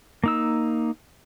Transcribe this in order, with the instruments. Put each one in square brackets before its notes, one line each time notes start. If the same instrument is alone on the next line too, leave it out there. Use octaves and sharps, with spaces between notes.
[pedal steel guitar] A#3 D#4 E6